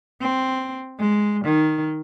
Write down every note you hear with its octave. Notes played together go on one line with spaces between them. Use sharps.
C4
G#3
D#3